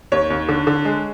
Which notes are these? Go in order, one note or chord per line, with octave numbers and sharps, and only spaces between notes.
D#2 C#5
D#2
D3
D3
G#3